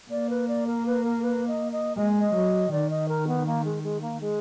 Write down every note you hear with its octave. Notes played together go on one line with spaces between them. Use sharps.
A#3 D5
B4
D5
A#4
B4
A#4
B4
D#5
D#5
G#3 D#5
D#5
F#3
D#3 D5
D#5
A#4
B3
A#3
G#3
G#3
A#3
G#3